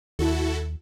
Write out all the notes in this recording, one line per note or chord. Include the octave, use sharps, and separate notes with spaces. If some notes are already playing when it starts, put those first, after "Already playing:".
D#2 E4 F#4 A4